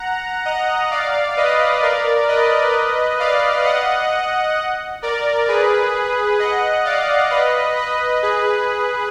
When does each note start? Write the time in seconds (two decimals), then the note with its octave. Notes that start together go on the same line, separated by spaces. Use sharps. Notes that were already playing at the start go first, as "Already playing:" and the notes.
Already playing: F#5 A#5
0.45 D#5 F#5
0.91 D5 F5
1.37 B4 D#5
1.82 A#4 D5
2.28 B4 D#5
3.19 D5 F5
3.65 D#5 F#5
5.02 A#4 D5
5.48 G#4 B4
6.39 D#5 F#5
6.85 D5 F5
7.31 B4 D#5
7.76 B4 D#5
8.22 G#4 B4